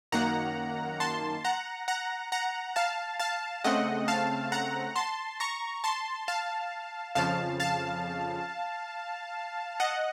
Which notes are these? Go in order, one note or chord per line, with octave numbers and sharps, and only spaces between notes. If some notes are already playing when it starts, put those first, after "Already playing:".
F#2 D#3 A#3 F#5 A#5
A5 C6
F#5 A#5
F#5 A#5
F#5 A#5
F5 A5
F5 A5
C#3 A3 C4 D#5 F#5
F5 A5
F#5 A#5
A5 C6
A#5 C#6
A5 C6
F5 A5
F2 C#3 F3 F5 A5
F5 A5
D#5 F#5